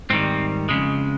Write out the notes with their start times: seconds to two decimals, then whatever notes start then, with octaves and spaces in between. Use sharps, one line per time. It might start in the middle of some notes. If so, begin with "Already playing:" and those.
0.10 G#2 D#3 G3 C4
0.69 F2 C#3 G#3